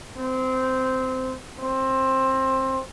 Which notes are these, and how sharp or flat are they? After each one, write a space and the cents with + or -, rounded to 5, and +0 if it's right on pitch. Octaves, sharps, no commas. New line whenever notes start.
C4 -15
C4 +20